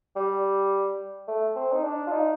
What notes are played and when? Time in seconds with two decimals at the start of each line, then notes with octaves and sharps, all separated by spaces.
0.16 G3
1.28 A3
1.56 C4
1.72 D#4
1.84 D4
2.07 F4
2.12 D#4